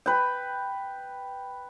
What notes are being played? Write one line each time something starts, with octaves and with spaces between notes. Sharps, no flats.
B4 G5